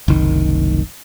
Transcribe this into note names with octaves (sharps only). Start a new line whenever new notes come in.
F#1 C2 D#3